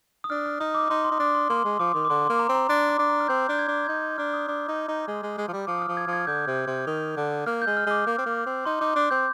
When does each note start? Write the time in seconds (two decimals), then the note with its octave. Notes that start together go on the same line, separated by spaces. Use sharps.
0.24 D#6
0.30 D4 F6
0.46 F6
0.60 D#4 D#6
0.75 D6
0.90 D#4 C6
1.04 C6
1.11 D#4
1.20 D4 D6
1.35 C6
1.50 A#3 C6
1.65 G#3
1.80 F3 D6
1.94 D#3
2.05 D6
2.10 D3 C6
2.25 A#3 C6
2.39 A#5
2.49 C4
2.55 A#5
2.69 D4 C6
2.89 D6
2.99 D4
3.09 A#5
3.20 F6
3.28 C4 G6
3.49 D4 G6
3.59 G#6
3.68 D4
3.84 G#6
3.88 D#4 G6
4.18 D4 F6
4.34 D#6
4.48 D4 D6
4.68 D#4
4.88 D#4
5.08 G#3
5.23 G#3
5.38 G#3
5.48 F3
5.53 G3
5.67 F3 D6
5.78 D#6
5.82 F6
5.88 F3
5.97 G#6
6.07 F3
6.13 G#6
6.27 D3 G6
6.47 C3
6.67 C3
6.87 D#3
7.17 D3
7.46 A#3 F6
7.62 G#3 G6
7.77 F6
7.86 G#3 D6
8.07 A#3
8.18 C4
8.26 A#3
8.46 C4
8.65 D#4 C6
8.81 D#4 D6
8.96 D4 D6
9.11 C4 G6